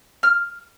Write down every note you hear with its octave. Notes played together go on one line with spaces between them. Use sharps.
F6